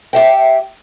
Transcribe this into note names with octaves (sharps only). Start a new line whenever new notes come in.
G4 E5 G5